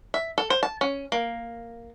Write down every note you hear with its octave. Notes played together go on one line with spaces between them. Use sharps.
E5
A4
C5
A5
C#4
A#3